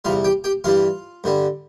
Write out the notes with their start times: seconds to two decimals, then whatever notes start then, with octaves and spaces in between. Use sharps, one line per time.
0.05 E2 C3 G3 F4 F5
0.24 G4 G5
0.44 G4 G5
0.64 G2 E3 G3 F4 F5
1.24 G2 D3 G3